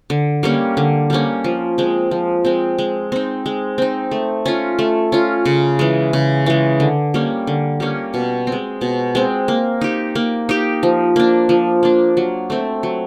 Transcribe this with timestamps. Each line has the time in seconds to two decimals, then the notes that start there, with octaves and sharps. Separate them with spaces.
0.10 D3
0.43 G3 A#3 C#4
0.77 D3
1.10 G3 A#3 C#4
1.44 F3
1.78 G#3 C4
2.11 F3
2.45 G#3 C4
2.79 G#3
3.12 C4 D#4
3.46 G#3
3.78 C4 D#4
4.11 A3
4.46 C#4 F4
4.79 A3
5.12 C#4 F4
5.45 C#3
5.79 E3 G#3
6.13 C#3
6.46 E3 G#3
6.80 D3
7.14 G3 A#3 C#4
7.47 D3
7.80 G3 A#3 C#4
8.14 B2
8.47 C4
8.52 G#3
8.81 B2
9.15 G#3 C4
9.48 A#3
9.81 D#4 G4
10.15 A#3
10.49 D#4 G4
10.83 F3
11.16 A#3 D4
11.49 F3
11.83 A#3 D4
12.17 F#3
12.50 A3 C4
12.83 F#3